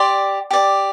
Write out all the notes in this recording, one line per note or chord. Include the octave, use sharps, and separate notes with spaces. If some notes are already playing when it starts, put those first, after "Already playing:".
Already playing: G4 D5 C6
G4 D5